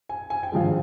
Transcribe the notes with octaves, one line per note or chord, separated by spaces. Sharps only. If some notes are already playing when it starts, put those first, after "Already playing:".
G#5
G#5
G5
G#1 G2 F3 G#3 F5